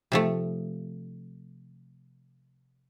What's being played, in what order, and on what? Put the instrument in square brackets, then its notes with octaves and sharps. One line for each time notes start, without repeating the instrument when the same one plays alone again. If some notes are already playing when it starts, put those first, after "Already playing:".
[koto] C3 F3 A3